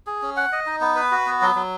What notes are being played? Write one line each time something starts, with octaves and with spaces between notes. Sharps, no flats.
G#4
C#4
F#5
D#5
D#4
B3
B4
F#4
B3
F#3
F#3